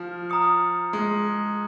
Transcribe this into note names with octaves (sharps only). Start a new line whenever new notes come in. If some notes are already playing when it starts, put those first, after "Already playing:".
Already playing: F3 F6
A#5 D#6 C#7
G#3